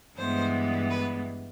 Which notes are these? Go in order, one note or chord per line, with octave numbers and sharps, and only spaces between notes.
G2 E3 G#3 B3 C5
B4